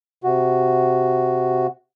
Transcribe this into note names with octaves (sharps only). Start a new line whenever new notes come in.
C3 F#4